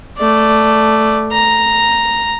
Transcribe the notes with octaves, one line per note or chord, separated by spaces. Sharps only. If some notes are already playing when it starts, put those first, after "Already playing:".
A3 D5
A#5